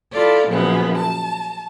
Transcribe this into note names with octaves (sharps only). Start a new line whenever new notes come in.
E4 F4 A4 D5
F#2 A#2 C#3 F3 B3
A5